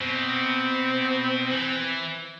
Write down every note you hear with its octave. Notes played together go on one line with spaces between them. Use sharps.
B2 C4
E3